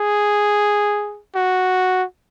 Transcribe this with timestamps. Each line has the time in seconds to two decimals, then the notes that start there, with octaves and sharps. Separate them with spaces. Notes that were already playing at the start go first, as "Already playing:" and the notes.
Already playing: G#4
1.35 F#4